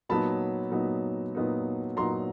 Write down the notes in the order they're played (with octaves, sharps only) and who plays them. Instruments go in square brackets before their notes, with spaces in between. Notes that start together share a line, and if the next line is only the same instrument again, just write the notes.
[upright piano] A#2 F#3 B3 D#4 A5 B5
A#2 F#3 B3 D#4
A#2 F#3 B3 D#4
A#2 F#3 B3 D#4 A#5 C6